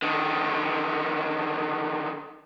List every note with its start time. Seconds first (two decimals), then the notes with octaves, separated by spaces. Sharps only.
0.02 D3 D#3